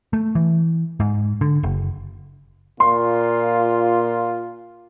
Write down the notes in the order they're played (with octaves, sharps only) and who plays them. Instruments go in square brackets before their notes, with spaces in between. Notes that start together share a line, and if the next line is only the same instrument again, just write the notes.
[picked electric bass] A3
E3
G#2
D3
F#1
[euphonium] A#2 [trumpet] F4 [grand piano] C6